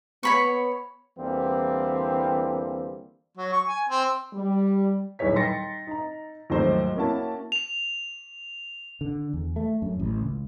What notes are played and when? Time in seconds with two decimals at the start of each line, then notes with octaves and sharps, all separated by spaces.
0.23 B3 C#5 B5 C#6
1.18 E2 D3 E3 G3 A#3 C4
3.37 F#3
3.53 C#6
3.67 G#5
3.89 C4
4.34 G3
5.19 D#1 B1 E4 G#4 C#5 B6
5.36 D#4 G5 C6 A6 A#6 C#7
5.87 D#4 A#5
6.50 D#2 G#2 F3 F#3 A3 C5
6.96 A#3 C#4 E4 F#4 A5
7.52 F7
9.01 D3
9.33 E2
9.56 A3
9.82 F#2
9.99 A1
10.21 C#2